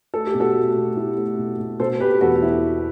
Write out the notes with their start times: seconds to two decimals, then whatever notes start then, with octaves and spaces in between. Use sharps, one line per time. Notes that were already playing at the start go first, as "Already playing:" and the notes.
0.14 A3 A4
0.27 G4
0.34 B2
0.40 F#4 A4
0.55 A3
0.77 B2
0.96 A3 E4 G4
1.18 A3
1.38 B2
1.59 B2
1.80 B2 A4 C5
2.00 B2 G4 B4
2.21 E2 F#4 A4
2.35 F#4
2.42 E4